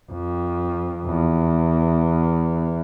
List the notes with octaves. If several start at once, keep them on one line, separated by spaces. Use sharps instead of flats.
F2
E2